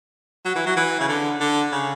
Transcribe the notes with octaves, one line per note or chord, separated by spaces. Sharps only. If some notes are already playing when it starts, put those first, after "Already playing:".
F#3
E3
F#3
E3
C#3
D3
D3
C#3